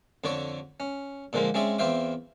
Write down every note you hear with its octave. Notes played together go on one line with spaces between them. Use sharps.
F2 D3 D4 C#5 D5 C#6
C#4
A#2 D3 F3 G#3 A#3
G#3 C4 C#4 G#4 D5 E5
E2 C4 F4 C5 E5 D6